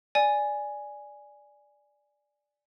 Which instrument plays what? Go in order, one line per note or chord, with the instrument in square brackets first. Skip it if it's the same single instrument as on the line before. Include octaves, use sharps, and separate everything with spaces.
[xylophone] D5 G#5